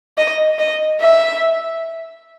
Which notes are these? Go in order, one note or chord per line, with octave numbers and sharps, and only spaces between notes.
D#5
D#5
E5